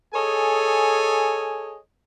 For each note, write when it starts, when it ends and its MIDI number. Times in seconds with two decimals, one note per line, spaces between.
0.14 1.77 68
0.14 1.77 69
0.14 1.77 73
0.14 1.77 75
0.14 1.77 80